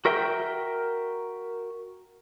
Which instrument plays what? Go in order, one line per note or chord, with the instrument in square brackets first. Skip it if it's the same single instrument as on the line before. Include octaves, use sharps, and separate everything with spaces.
[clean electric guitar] F#4 A#4 E5 G5